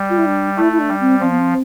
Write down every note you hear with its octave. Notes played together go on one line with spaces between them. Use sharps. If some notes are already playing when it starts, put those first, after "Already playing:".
Already playing: G3
F4
E4
D4
A3 E4
E4
D4
G3
C4
F3 C4
B3
C4